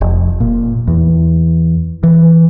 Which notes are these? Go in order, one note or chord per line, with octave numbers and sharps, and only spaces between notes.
F1
A#2
E2
E3